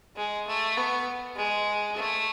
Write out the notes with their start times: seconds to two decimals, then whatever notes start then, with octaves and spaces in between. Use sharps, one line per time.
0.16 G#3
0.47 A3
0.77 B3
1.36 G#3
1.96 A3